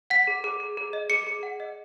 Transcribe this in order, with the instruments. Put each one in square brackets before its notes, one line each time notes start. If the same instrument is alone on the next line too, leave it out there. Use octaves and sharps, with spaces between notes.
[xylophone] F#5 B6
G#4
G#4
G#4
G#4
D#5
G#4 C#7
G#4
F#5
D#5